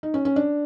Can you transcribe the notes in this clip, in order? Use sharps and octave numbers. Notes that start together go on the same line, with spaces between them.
D#4
C#4
C#4
D4